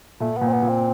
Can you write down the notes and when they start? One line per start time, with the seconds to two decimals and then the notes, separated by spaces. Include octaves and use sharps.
0.20 A#2 A3
0.37 A#2 B3
0.47 C4
0.52 B3
0.62 A#2
0.68 C4